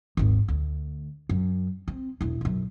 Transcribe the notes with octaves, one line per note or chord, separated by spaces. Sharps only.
G#1 D#2
D2
F#2
C4
E1 E4
B1 F#2